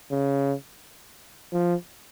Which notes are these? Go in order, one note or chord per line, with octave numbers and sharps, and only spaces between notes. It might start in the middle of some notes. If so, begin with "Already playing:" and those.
C#3
F3